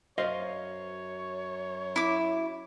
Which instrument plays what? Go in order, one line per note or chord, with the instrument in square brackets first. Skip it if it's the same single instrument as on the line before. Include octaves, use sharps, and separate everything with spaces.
[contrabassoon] F#2 [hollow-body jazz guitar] C5 D#5 F5 [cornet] C#5
[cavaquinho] E4 D6